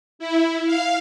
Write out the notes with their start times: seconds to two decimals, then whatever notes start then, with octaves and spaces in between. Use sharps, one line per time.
0.19 E4
0.66 F5